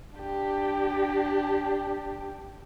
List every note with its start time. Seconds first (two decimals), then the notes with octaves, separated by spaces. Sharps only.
0.17 D4 G4